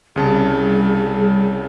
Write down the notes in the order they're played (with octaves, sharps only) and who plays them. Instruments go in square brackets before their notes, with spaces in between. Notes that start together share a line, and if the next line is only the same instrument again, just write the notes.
[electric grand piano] C2 C#3 A5 [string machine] G3 [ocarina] G#4